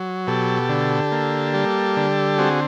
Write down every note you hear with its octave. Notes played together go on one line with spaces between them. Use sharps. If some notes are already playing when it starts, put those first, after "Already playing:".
Already playing: F#3
B2 G4 A4
D3
A#3
G3
D3
C4 F#4 G#4